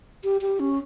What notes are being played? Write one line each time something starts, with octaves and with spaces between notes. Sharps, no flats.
G4
G4
C#4